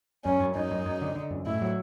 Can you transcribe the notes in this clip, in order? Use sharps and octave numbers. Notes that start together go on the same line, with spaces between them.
F#2 C#4
F#2
F#2 D#4
F#2
F#2
D3
D3
F#2
A2 E4
F#3